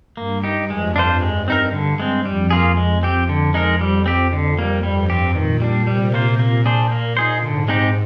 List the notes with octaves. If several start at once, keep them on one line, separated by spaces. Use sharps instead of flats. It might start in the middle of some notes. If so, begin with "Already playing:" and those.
G2 A#3
D#4 G4
F2 G#3
D4 F4 C5
G2 G#3
C4 D#4 A#4
D3
G#3 C4
F2 G3
A#3 F4 G#4
G#3
C4 G4
D3
G#3 D#4 A#4
F2 G3
C4 G4
D3
G3 A#3
G2 G3
C4 G4
A#2 D#3
G3 D4
C3 G3
A#3 F4 C5
A#2 A#3
D4 G#4 C5
A#3
D#4 G#4 C5
G#2 D3
G#3 C4 D#4 G4